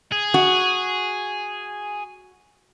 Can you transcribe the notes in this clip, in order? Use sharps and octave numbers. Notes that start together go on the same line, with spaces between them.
G#4
F#4